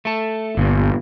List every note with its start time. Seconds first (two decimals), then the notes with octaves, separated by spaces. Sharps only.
0.05 A3 A4
0.57 G1 G2 A#2